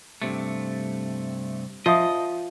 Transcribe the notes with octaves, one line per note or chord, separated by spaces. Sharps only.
G2 C3 A3
F3 F4 D#5 E5 D#6